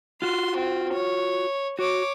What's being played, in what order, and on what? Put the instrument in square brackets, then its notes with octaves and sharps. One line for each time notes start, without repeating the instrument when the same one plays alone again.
[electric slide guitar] F4 F#4 [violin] C6
[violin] C4
C#5
[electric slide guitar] F#4 [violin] C#5 D6